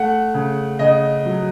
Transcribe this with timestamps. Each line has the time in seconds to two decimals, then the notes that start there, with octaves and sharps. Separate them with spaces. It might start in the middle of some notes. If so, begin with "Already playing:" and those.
Already playing: A3 F#5
0.34 C#3
0.79 C#3 D#5
1.26 F#3